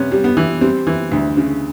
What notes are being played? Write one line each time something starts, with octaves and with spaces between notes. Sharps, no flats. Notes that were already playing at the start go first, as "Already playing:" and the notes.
Already playing: C3 B3 C#4
G3
B3
E3
G3 C4
E3
D2
C#3